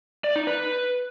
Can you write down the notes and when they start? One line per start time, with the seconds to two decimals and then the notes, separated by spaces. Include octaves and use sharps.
0.24 D5
0.36 D#4
0.47 B4